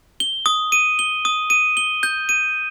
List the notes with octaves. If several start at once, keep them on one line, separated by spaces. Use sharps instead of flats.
G7
D#6
D#7
G7
D#6
D#7
G7
G6
D#7